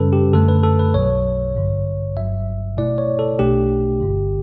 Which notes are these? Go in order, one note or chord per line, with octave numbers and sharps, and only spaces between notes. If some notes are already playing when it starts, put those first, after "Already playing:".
Already playing: F#2 C#3 G3 C#4 A4 B4
G4
F#2 D3 A3 A4
B4
A4
B4
B1 B2 F#3 C#5
A1 G2 D3
G1 G2 F#3 E5
B2 A3 E4 D5
C#5
A4
B1 B2 A3 D4 G4
G1 G2 D3